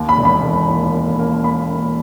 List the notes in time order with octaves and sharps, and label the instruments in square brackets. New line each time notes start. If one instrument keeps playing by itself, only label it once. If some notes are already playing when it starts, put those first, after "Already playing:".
Already playing: [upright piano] D#2
B5
E1
B5
E1
D#2
A#3
A#3
A#3 B5
A#3